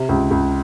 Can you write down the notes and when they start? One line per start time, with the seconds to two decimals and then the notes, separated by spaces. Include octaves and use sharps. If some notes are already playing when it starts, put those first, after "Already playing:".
Already playing: C3
0.09 C#2
0.31 C#2